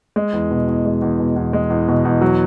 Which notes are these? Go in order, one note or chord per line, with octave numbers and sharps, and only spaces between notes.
G#3
E2
B2
E2
G#3
E2
B2
E2
G#3
E2
B2
E2
F#3